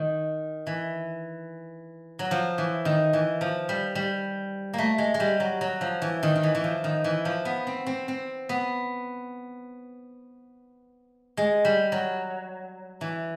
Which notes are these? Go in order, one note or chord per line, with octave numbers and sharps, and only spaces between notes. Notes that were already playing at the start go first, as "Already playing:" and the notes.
Already playing: D#3
E3
F#3
F3
E3
D#3
E3
F3
G3
G3
A3 A#3
G#3
G#3
G3
F#3
F#3
F3
E3
D#3
D#3
E3
E3
F3
D#3
E3
F3
B3
C4
C4
C4
B3
G#3
G3
F#3
E3